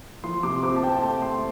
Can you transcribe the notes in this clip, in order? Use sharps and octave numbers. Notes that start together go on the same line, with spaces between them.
F3 C6
C3 D6
C4 D6
A5
C4 G5
A5
A3 A5
A3 C6